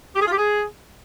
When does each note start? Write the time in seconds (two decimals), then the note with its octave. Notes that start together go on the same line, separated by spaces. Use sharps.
0.15 G4
0.20 G#4
0.26 F4
0.31 G4
0.37 G#4